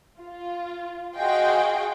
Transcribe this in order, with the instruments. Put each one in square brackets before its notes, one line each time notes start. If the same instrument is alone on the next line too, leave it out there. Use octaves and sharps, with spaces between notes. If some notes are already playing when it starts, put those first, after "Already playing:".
[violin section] F4
F#4 G#4 D#5 F5 G5 C6